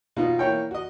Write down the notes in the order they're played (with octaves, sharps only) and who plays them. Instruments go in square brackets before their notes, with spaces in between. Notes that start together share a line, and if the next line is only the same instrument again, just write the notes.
[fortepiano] B2 D#4 F4
A#3 E4 C#5 G5
F#4 D#5